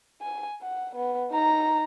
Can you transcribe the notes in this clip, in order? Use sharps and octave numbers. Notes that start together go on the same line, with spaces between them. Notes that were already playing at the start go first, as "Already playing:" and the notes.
G#5
F#5
B3
D#4 A#5